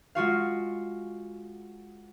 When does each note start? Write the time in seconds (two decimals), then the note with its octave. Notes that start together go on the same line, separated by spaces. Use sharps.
0.15 G#3 F4 F#4 F5